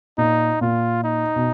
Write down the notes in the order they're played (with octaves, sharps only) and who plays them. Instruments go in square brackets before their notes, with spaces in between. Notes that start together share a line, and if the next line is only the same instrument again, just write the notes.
[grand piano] A#2 [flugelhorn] D#4
[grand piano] A#2 [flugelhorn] F4
[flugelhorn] D#4
[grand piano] B2